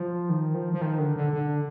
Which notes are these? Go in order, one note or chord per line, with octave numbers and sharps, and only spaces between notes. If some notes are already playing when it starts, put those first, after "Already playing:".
Already playing: F3
D#3
F3
F3
D#3
D3
D3
D3